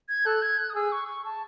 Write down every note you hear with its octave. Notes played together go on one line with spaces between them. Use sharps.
G#6
A4 F#6
G#6
F#6
D#6
G#4 E6
C#6
C#6
A5